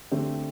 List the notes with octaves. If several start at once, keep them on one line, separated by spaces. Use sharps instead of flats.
D3 A3 C4 G4